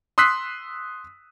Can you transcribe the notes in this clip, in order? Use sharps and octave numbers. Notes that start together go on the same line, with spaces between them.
C6 D#6 E6 F#6 B6 C7